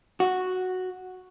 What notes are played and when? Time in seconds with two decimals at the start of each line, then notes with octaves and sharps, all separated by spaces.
0.20 F#4